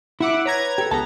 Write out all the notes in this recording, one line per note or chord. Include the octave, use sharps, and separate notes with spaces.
E4 E5 F#5 D6
B4 C#5 A#5 G#6
G4 A4
C#2 B3 A4 A5 A#5